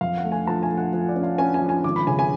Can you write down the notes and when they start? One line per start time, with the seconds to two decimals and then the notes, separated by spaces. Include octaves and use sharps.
0.01 F2 F5
0.17 F#5
0.25 A3
0.32 G#5
0.47 F3 A5
0.63 G#5
0.70 A3
0.77 F#5
0.93 F3
1.09 D5
1.16 C#4
1.23 F5
1.38 C#4 G#5
1.54 G#5
1.61 F3
1.69 G#5
1.84 G#1 D6
1.96 B5
2.07 C#3 G#5
2.19 G#5